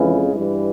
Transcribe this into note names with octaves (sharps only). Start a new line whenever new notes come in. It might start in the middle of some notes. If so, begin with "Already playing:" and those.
Already playing: F2 C#3 E3 G#3
G2 E3 G3